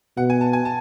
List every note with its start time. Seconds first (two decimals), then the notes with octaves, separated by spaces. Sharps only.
0.17 B2 F#5
0.30 G#5
0.41 A5
0.53 G#5
0.65 A5